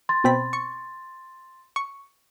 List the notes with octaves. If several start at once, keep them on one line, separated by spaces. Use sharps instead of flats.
C6 A6
B2 C4 B5
C#6
C#6